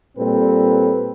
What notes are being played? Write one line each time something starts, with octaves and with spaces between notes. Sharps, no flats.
A#2 G3 C4 A4 B4